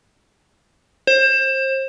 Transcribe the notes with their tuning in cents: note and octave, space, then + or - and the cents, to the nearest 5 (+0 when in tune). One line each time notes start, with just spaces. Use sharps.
C5 +30